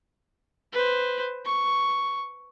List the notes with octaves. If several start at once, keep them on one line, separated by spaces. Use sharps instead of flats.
B4 C5
C#6